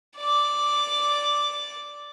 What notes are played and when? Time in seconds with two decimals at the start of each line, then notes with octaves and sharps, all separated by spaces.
0.18 D5 D6